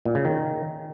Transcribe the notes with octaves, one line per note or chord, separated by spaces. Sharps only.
A#2
C#3
D#3